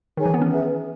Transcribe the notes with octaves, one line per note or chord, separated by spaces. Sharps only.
D#3 D#4 G#4 C#5 G#5
E3
B3
C#4
G#4 B4 E5